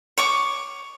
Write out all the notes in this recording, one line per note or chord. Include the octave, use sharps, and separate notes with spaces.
C#5 C#6 D6